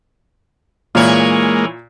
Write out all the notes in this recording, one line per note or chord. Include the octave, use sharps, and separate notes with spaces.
A#2 E3 G#3 A#3 C#5